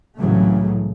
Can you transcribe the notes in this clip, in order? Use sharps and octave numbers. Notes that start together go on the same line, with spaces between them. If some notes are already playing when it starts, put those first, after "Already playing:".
C2 A2 C#3 E3 F#3 A3